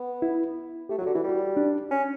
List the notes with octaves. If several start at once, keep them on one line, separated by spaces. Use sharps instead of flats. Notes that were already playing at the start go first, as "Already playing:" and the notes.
Already playing: B3
E4
A3 G4
F#3
D3 F#4
E3 E4
G3 F#4
D4
C#4